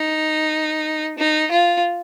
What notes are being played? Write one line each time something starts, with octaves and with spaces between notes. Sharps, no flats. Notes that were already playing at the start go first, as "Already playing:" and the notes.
Already playing: D#4
D#4
F4